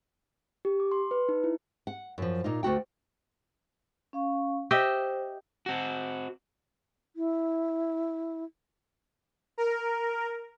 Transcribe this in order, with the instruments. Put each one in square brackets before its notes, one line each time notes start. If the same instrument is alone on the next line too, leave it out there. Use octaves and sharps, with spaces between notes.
[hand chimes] G4
D6
C6
B4
D#4
E4
[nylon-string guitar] F#5
F#2 F3
A#2 D#4 F4
D2 A3 F#4 G5
[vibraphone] C#4 F5 C#6
[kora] G4 D#5 E5 [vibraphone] C5
[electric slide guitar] C4 F#4
[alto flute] E4
[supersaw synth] A#4